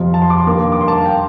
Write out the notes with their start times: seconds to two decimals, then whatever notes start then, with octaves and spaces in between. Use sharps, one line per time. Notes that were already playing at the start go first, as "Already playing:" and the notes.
Already playing: F2 C3 F3
0.14 A5
0.22 C6
0.30 D6
0.38 C6
0.47 G2 D#3 A#3 D6
0.72 D6
0.81 C6
0.88 A5
0.97 F5
1.06 G5